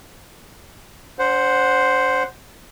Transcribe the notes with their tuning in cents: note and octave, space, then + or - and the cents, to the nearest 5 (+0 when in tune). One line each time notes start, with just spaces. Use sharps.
D4 -40 C5 +0 F#5 +0